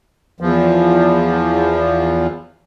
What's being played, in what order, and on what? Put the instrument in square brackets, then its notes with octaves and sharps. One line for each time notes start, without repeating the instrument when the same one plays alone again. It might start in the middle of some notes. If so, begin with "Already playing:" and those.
[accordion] E2 F3